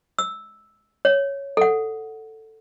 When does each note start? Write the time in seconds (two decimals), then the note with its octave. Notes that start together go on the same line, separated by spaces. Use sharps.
0.19 E6
1.05 C#5
1.57 A4 F#5